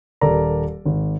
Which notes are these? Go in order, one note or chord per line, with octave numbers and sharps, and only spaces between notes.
D#1 A4 A#4 D5 A#5
G#1